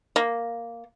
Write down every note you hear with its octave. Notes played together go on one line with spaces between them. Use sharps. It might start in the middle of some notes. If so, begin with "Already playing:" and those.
A#3